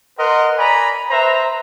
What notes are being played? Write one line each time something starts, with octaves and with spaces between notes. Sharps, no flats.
A#4 B4 D#5 F#5 C6
D5 G#5 A#5 B5
B4 C5 E5 A#5